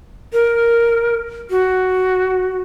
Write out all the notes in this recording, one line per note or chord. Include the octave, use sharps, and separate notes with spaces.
A#4
F#4